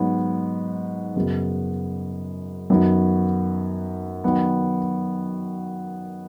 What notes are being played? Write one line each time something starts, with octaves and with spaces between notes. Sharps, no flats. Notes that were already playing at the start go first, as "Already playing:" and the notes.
Already playing: G#2 F#3 B3
F#2 C#3 B3 F#4
F#2 D#3 F#3 B3 F#4
D#3 F#3 B3 F#4